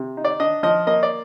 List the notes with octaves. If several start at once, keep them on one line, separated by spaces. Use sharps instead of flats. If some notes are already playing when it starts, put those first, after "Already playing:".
Already playing: C3
D#4
D5
D4 D#5
F3 D#5
A#3 D#5
D5